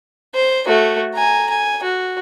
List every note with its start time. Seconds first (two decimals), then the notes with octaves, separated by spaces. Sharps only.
0.35 C5
0.68 A3 F#4
1.15 G#5 A#5
1.50 G#5
1.84 F#4